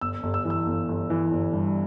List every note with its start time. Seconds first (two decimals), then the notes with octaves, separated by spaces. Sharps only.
0.01 G1 E6
0.23 G1
0.34 E6
0.45 E3
0.50 E6
0.66 G1
0.88 G1
1.10 E3
1.31 G1
1.53 G2